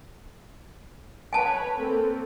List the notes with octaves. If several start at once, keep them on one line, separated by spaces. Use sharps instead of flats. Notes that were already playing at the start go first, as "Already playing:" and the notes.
B4 C#5 G#5 A5
A#3 C4 A4